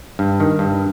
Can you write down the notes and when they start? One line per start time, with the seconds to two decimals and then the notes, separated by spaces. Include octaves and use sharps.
0.19 G2
0.40 D#3
0.59 G2